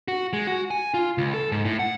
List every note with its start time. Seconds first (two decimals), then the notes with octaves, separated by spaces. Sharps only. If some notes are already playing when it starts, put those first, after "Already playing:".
0.08 F#4
0.33 G#3
0.47 F#4
0.71 G#5
0.94 F4
1.18 C#2
1.34 A4
1.52 G#2
1.65 A2
1.79 F#5